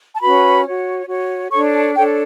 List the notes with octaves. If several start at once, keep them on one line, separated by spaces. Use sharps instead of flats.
A5
C#4 F#4 B4 B5
F#4 C#5
F#4 C#5
D4 A4 C#5 C#6
A5
D4 A4 C#5 G5